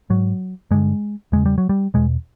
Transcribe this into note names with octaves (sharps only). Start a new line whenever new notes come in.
G#2 F#3
G2 D3 G#3
E2 C#3 G#3
G3
F#3
G3
E2 B2 G#3